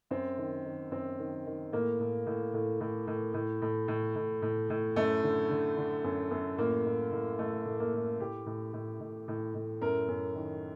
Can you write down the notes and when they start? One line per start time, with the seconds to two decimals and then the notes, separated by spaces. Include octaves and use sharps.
0.11 F#2 C4
0.38 D#3
0.65 D#3
0.91 F#2 C4
1.19 D#3
1.46 D#3
1.72 A2 A#3
2.00 A2
2.26 A2
2.54 A2
2.80 A2
3.07 A2
3.34 A2
3.62 A2
3.88 A2
4.16 A2
4.42 A2
4.70 A2
4.96 F#2 A3
5.23 D3
5.50 D3
5.77 D3
6.04 F#2
6.31 F#2
6.58 A2 A#3
6.85 A2
7.12 A2
7.39 A2 A3
7.66 A2
7.80 A#3
7.93 A2
8.20 A2 G4
8.46 A2
8.73 A2
9.00 A2
9.28 A2
9.54 A2
9.81 F#2 A#4
10.08 F#2
10.35 D#3